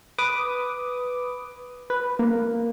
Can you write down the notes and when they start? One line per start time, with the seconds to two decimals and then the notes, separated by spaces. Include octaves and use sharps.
0.18 B4 D6 D#6
1.90 B4
2.19 A#3